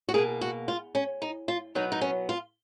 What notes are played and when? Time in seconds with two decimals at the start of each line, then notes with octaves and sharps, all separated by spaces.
0.09 F#4
0.14 B2 A#3 G#4
0.41 F#4
0.68 F4
0.95 C#4
1.22 D#4
1.48 F4
1.75 B2 F#3 B3 D#4
1.92 D#4
2.01 C#4
2.29 F4